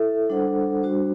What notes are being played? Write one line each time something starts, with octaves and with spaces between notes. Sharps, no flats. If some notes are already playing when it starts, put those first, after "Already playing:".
Already playing: E4 A4 E5
G3 D4 A4 C5 F#5
G3 D4 F#4 C5